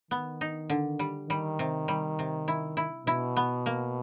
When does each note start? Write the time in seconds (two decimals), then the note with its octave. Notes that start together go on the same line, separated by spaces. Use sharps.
0.11 D#3 B3
0.41 D#4
0.70 D3
0.99 G3
1.29 D#3 G3
1.59 C3
1.88 G3
2.19 C3
2.48 E4
2.77 E4
3.07 B2 E4
3.37 B3
3.66 A#3